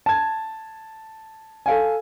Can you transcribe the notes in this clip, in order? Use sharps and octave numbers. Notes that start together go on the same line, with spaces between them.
A5 G#6
A4 F5 G#5